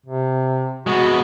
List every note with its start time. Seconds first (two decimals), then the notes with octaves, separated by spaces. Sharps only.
0.06 C3
0.87 G#3 B3 F#4